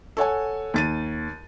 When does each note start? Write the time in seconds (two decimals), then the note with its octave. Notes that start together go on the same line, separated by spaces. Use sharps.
0.17 A4 C#5 F#5 G#5
0.74 D#2 A6 D#7